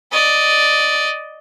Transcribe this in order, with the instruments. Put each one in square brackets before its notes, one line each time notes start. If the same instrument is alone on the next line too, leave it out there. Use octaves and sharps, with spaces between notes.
[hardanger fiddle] D5 D#5